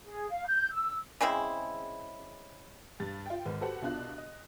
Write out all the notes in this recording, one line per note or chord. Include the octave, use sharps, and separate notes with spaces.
G#4
F5
G6
E6
C#3 G#3 C4 E4
G2 A6
F4 G5
G#1 G#2 B4
F#4 G4 A4 B4 C5 F#5
C2 B2 D4 F4 F#6
D#5